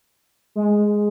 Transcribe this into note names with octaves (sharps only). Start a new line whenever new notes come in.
G#3